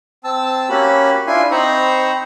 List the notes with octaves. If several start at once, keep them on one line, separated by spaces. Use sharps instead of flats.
C4 A5 E6
A#3 C#4 F#4 G4 B5
D4 E4 F4 G#5 C6
C4 D#4 C5 A#5 B5 C#6